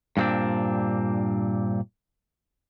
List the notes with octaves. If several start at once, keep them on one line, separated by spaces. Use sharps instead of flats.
G2 A#2 A3 C4 D4